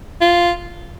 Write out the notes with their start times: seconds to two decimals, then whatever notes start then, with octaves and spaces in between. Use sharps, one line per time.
0.21 F4